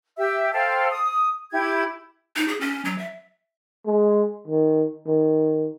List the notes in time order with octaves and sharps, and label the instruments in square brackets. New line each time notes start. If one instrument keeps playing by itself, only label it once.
[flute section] G4 E5 E6
A4 C5 F5 G5
D#6
E4 G4 G#6
[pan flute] D#4
G#4
C#4
F#3
E5
[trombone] G#3
D#3
D#3